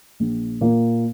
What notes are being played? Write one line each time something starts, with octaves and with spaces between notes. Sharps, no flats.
A#1
A#2 A#3